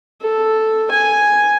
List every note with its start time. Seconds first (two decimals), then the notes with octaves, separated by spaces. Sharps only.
0.22 A4
0.91 G#5